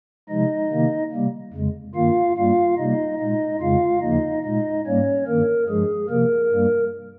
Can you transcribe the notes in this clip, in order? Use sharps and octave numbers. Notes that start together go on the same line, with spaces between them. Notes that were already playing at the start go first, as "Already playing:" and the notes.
C3 F3 G#3 D#4 D#5
C3 D#3 A#3
C3 G3 A#3
F2 C#3 G#3
G2 D#3 A#3 F4 F5
G2 G3 A#3 F4 F5
C3 G3 A#3 D#4 D#5
A#2 G#3 D#4 D#5
F2 C#3 G#3 F4 F5
D#2 C#3 F3 A#3 D#4 D#5
A#2 G#3 D#4 D#5
G#2 G3 A#3 C#4 C#5
G2 D#3 A#3 A#4
G2 F3 G#3 G#4
C3 F3 A#3 A#4
G2 G3 A#3